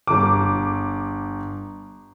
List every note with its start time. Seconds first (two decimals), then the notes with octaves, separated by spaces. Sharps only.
0.07 G1 D6